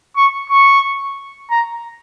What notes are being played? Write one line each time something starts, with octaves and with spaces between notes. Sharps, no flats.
C#6
C#6
A#5